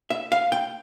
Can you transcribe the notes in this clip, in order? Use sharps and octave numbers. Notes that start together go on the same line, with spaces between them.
E5
F5
G5